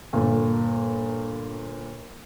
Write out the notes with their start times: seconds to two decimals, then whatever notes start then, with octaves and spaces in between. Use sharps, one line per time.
0.13 G1 A#2